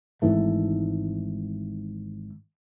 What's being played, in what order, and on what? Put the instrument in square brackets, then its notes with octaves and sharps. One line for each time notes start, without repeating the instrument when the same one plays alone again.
[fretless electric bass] G#1 G#2 E3 A3